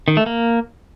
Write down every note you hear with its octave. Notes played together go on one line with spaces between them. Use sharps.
D#3
A3
A#3